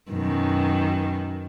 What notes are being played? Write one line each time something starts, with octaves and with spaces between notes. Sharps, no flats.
F#2 B2 D#3